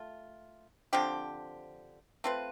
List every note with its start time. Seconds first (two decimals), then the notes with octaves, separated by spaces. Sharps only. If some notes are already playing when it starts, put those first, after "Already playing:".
Already playing: A3 F4
0.93 D3 F3 C4 G4
2.24 A3 C4 F4 B4